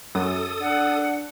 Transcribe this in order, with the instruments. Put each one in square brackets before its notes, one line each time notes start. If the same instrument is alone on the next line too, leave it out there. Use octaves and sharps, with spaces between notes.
[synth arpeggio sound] F#2 [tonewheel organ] A4 D#6
[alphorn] D4 [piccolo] F#5